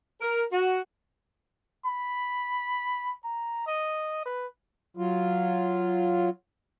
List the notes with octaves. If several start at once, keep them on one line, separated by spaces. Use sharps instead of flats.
A#4
F#4
B5
A#5
D#5
B4
F#3 F4